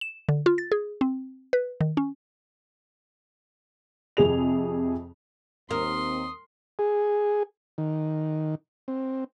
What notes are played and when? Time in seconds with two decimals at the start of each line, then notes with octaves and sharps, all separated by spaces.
0.01 E7
0.29 D3
0.46 F4
0.58 A6
0.72 G#4
1.01 C4
1.53 B4
1.81 D#3
1.97 C#4
4.17 F2 C3 G#4 F7
5.71 D#2 C4 A#4 C6 D#6
6.79 G#4
7.78 D#3
8.88 C4